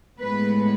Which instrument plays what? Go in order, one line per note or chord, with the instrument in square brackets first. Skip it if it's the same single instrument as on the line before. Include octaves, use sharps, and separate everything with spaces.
[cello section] A2 G#3 B3 B4